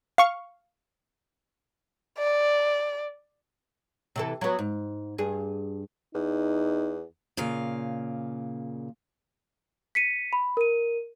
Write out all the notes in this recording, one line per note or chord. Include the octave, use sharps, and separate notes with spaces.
F5 C#6
D5
C3 E3 A4
F#3 B3
G#2
G2 G#4
E2 D#4
A#2 C#3 F5
B6 C#7 D#7
B5
A#4 D#7